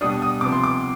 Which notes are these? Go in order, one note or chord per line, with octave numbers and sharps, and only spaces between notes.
B2 G3 D4 D#6
D#6
C3 F3 B3 D6
C6
D6